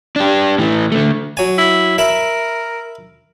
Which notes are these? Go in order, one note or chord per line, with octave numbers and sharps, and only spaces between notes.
D4 G4
A2 E3
D3 A3
F#3 G#5
E4
A#4 E5 B5